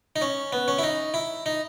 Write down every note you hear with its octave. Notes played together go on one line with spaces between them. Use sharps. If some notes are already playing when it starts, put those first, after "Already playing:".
D#4
C#4
B3
C#4
E4
D#4
E4
D#4